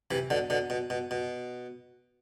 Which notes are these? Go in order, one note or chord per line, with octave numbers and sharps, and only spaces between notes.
C3 E3
B2 D3
B2 D3
B2
B2
B2